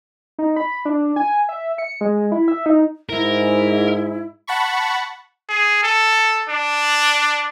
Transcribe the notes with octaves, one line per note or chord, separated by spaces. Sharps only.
D#4
B5
D4
G#5
E5
C#7
G#3
E4
E5
D#4
G#2 E4 A#4
F#5 A5 B5 C#6
G#4
A4
D4